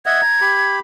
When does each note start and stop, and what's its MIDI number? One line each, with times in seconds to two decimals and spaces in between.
0.06 0.21 75
0.06 0.21 76
0.06 0.21 78
0.06 0.75 92
0.22 0.41 82
0.41 0.80 67
0.41 0.80 83